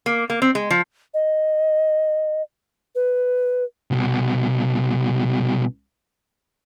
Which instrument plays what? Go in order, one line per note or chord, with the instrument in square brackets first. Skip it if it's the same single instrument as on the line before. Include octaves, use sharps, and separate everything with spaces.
[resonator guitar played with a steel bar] A#3
A#3
C4
G#3
F3
[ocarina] D#5
B4
[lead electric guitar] C2 B2